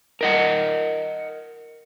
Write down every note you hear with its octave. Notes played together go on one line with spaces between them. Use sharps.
A#4 D#5 F#5